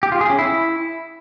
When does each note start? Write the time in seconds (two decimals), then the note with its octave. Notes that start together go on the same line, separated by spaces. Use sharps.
0.03 G4
0.12 F4
0.21 G#4
0.30 C#4
0.39 E4